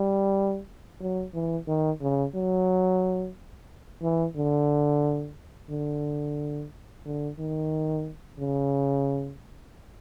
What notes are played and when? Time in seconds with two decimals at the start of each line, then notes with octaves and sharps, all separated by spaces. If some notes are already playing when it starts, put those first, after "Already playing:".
Already playing: G3
1.01 F#3
1.34 E3
1.67 D#3
2.01 C#3
2.35 F#3
4.03 E3
4.36 D3
5.70 D3
7.06 D3
7.39 D#3
8.40 C#3